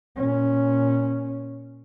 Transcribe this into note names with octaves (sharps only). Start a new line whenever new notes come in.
A#2 C#4